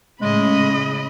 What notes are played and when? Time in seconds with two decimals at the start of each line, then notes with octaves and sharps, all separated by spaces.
0.22 A2 C#3 G#3 D#5 B5